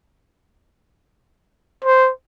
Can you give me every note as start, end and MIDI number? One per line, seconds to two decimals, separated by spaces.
1.84 2.11 72